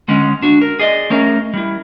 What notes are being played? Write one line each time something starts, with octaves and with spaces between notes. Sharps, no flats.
D3 G#3 C#4
D4 F#4
A#4
G#4 D5 D#5
A3 C#4 A#4
G3 E4